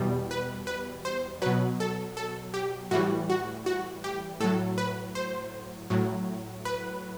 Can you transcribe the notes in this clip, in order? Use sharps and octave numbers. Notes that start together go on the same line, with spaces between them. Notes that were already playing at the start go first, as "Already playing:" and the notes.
Already playing: E2 B2 G3
B4
B4
C5
B2 F#3 B4
A4
A4
G4
A2 E3 G3 F#4
F#4
F#4
G4
A2 F#3 A4
B4
C5
A2 F#3
B4